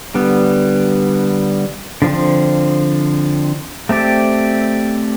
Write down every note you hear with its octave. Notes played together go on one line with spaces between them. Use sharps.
D3 G3 B3
D3 F3 C4
A3 C4 G4 D5